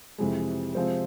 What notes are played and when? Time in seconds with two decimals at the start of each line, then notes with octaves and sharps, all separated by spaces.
0.18 F2 C3 E3 G#3
0.75 C3 F3 G#3 C4